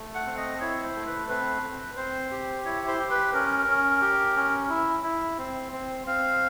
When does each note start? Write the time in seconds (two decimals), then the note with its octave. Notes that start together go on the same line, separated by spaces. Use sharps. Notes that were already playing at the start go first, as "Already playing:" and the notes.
Already playing: A3
0.15 F#5
0.26 C4
0.37 D#5
0.61 E4 C#5
0.83 C5
0.95 A3
1.06 B4
1.29 C4 B4
1.63 C4
1.97 C4 C5
2.31 G4
2.65 E4 C#5
2.88 C5
3.00 G4
3.10 B4
3.33 C#4 A#4
3.67 C#4
4.01 G4
4.36 C#4
4.69 E4
5.04 E4
5.38 C4
5.72 C4
6.07 C4 F5